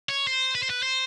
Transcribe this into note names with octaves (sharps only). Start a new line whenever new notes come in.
C#5
C5
B4
C5
B4
C5